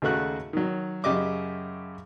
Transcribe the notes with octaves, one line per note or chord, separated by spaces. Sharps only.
D#2 C#3 A3 F#4 F#6
D#3 F#3
F#2 C#3 G4 D#5 E5 D6